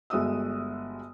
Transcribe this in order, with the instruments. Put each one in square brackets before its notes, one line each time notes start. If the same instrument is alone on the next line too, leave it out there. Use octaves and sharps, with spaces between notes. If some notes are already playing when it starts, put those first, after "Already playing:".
[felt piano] G1 G#3 F#4 E5 D#6 E6